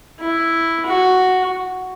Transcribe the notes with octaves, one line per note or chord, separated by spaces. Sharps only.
E4
F#4